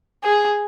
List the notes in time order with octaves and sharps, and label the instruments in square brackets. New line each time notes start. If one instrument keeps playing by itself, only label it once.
[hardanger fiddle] G#4